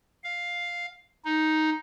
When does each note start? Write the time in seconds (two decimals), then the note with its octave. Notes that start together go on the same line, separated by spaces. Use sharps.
0.24 F5
1.25 D#4